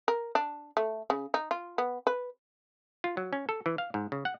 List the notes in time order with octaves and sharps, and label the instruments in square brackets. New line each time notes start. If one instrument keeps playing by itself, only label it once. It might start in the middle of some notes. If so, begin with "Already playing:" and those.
[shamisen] A#4
D4
A3
C#3
D#4
F4
B3
B4
[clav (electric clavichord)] F4
F#3
C#4
A4
E3
F5
G#2
C#3
F#5